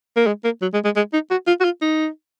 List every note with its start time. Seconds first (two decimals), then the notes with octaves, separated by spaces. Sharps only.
0.16 A#3
0.27 G#3
0.44 A#3
0.62 F#3
0.74 G#3
0.84 G#3
0.96 G#3
1.13 D#4
1.31 F#4
1.47 F4
1.60 F#4
1.64 F4
1.82 D#4